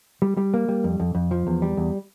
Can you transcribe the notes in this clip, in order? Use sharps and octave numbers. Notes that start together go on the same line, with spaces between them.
G3
G3
A#3
G3
F2
F2
F2
F3
E2
G3
E2